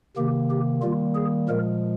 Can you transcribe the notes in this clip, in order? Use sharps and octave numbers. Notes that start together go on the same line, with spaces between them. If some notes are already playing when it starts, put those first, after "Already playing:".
C3 D#3 A#3 G4
G4
D#3 G3 A#3 F4
G#4
A#2 F3 G#3 A#4